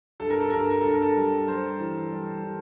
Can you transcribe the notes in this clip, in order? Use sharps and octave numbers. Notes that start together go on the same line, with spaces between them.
G2 A4
A#4
A4
G2 A#4
A4
A#4
G2 A4
A#4
A4
G3
G3 C5
E3
G3
E3